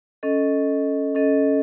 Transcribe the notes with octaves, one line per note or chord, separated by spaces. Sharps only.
C#4 A4 D#5
C#4 A4 D#5